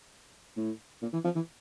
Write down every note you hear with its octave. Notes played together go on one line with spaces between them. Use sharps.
A2
A#2
E3
F3
E3